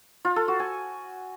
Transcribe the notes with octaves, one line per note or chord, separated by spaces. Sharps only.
F4
A4
F#4
G#5